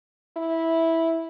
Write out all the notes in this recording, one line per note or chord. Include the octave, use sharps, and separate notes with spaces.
E4